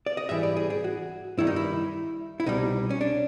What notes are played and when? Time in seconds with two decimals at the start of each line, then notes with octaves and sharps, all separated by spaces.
0.06 D5
0.17 D#5
0.29 G#2 E3 G3 E5
0.43 D5
0.57 G#4
0.70 G#4
0.84 F#4
1.38 G2 D#3 G3 E4
1.47 D#4
1.56 E4
2.40 E4
2.46 C2 B2 G3 D#4
2.90 C#4
3.01 D4